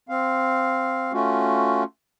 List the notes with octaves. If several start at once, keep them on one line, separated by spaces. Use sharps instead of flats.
C4 F5
A3 C#4 F4 F#4